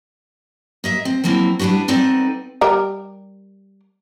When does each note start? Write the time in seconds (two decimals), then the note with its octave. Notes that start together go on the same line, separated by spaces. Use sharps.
0.84 A#3 D#5 E5
1.05 C4
1.24 F3 F#3 A#3 C4 E4
1.59 G3 B3 D4 E4 F#4
1.88 B3 C4 D#4 A4 D5
2.61 G3 A#4